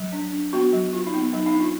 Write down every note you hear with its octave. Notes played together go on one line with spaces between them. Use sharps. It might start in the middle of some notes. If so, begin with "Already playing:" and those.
Already playing: F#3
D4
D4
B3 F#4
F#3
F#3 F4
D#4
B3
F#3 D#4
D#4
D4
F4